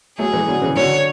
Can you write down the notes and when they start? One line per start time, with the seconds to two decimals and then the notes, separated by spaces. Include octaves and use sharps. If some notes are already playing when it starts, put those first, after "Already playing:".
0.18 F#3 A3 G#4
0.33 E3 G#3
0.48 D3 F#3
0.62 C#3 E3
0.76 D3 F#3 C#5